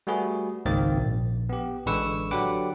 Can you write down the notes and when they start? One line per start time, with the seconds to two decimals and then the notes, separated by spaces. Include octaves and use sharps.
0.07 G3 A3 F#4 G#4 B4
0.65 G#1 C#2 D#3 A#3 C4 A6
0.97 A#1
1.49 B3 G4
1.86 A1 D3 G#3 B4 C#6 E6
2.31 D3 F#3 G4 B4 F#5 D6